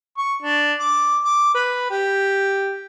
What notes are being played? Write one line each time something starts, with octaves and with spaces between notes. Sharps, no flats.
C#6
D4
D6
D6
B4
G4